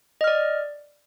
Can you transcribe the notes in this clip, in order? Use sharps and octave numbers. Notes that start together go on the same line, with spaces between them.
D5 D#5 F6